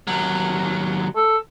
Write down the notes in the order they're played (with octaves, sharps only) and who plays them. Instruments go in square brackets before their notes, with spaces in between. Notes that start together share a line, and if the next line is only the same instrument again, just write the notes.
[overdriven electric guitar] D#2 F#3
[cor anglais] A4